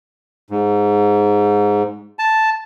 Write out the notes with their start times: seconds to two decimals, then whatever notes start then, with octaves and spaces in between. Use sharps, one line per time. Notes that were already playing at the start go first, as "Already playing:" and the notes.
0.50 G#2
2.19 A5